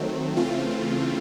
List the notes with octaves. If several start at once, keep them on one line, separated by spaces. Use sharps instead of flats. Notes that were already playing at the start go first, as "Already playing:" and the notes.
Already playing: D#3 F#3 A3 C4
C#3 E3 A3 C4 F4